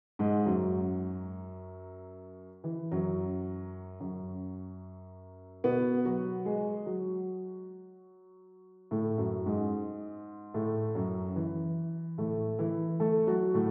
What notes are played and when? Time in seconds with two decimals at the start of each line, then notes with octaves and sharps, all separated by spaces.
0.19 G#2 G#3
0.46 F#2 F#3
2.64 E3
2.91 F#2 F#3
4.00 F#2 F#3
5.64 B2 B3
6.05 F#3 F#4
6.45 G#3 G#4
6.86 F#3 F#4
8.91 A2 A3
9.18 F#2 F#3
9.46 G#2 G#3
10.54 A2 A3
10.95 F#2 F#3
11.36 E3
12.18 A2 A3
12.59 E3 E4
13.00 A3 A4
13.27 F#3 F#4
13.54 A2 A3